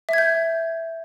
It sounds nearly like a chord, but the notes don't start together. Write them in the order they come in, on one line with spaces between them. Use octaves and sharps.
E5 G#6 G6